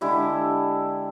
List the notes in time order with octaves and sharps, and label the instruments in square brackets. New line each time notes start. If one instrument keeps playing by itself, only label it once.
[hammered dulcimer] D3 G#3 E4 G4